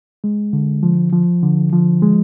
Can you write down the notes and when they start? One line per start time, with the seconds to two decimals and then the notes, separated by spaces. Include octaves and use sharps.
0.24 G#3
0.53 D3
0.83 F3
1.13 F3
1.43 D3
1.72 F3
2.02 G#3